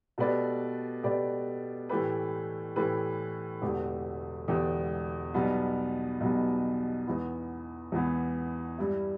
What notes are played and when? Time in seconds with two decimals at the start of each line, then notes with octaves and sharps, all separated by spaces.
0.18 B2 A3 G4 B4 D5
1.03 B2 A3 G4 B4 D5
1.89 A2 E3 A3 G4 B4
2.76 A2 E3 A3 G4 B4
3.62 E1 E2 D3 A3 G4
4.48 E1 E2 D3 A3 G4
5.34 B1 B2 G3 B3
6.20 B1 B2 G3 B3
7.06 E2 E3 B3
7.92 E2 E3 B3
8.78 G2 G3 E4